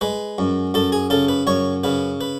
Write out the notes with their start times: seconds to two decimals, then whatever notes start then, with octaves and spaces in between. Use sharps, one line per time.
0.01 G#3 B4
0.38 F#2
0.74 F#2 A4
0.92 G#4
1.10 C#3 A4
1.28 B4
1.47 F#2 C#5
1.84 C#3 B4
2.21 B4